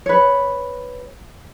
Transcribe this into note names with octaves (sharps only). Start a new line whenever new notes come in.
B4 C#5